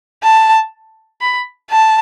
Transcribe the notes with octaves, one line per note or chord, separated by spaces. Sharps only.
A5
B5
A5